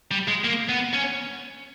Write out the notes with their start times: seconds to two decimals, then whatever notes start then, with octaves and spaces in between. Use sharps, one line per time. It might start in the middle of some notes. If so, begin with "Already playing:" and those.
0.11 G3
0.28 G#3
0.44 A#3
0.69 B3
0.93 C#4